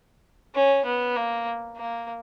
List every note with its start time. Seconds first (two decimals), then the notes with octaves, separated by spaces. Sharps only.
0.55 C#4
0.85 B3
1.16 A#3
1.76 A#3